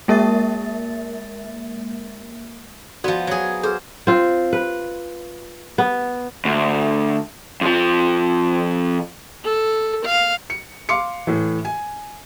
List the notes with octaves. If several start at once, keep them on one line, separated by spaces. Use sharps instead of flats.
G#3 A#3 A#4 E5 A6
F3 B3 F#4 D5
F#3 G#4
G#4 B4 C5
C4 F4
B4
B3
D2
F2 F3
A4
F5
C#7
F5 C6 D6 C#7
A2 E3
G#5